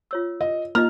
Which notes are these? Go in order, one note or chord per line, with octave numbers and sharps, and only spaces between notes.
F4 C#5 E6
D#5
A#3 D#4 F4 D#5 F6